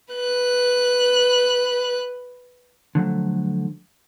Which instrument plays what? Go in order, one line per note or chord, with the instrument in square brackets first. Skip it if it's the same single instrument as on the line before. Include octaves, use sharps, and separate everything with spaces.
[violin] B4 F#6
[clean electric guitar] D3 F3 F#3 A3